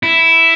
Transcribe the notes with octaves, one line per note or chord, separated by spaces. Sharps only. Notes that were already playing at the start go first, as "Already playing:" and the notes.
E4